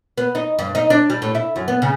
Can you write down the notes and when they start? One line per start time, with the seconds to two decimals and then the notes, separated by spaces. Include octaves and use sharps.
0.18 B3
0.35 D#4
0.59 G2
0.75 D#4
0.90 D4
1.10 G3
1.22 A2
1.35 E4
1.56 F#2
1.68 B3
1.82 C#3